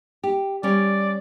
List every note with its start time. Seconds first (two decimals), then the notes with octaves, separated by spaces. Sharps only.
0.23 G4
0.63 G3 C#4 D5